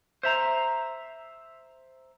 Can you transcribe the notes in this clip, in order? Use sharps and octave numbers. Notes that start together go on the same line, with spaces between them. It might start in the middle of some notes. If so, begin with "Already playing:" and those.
C5 E5 A#5